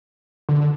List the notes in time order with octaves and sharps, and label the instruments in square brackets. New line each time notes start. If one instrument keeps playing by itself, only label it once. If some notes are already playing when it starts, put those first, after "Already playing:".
[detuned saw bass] D3